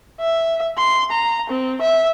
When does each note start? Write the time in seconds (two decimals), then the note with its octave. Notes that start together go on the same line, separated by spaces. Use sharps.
0.21 E5
0.78 C6
1.11 A#5
1.50 C4
1.81 E5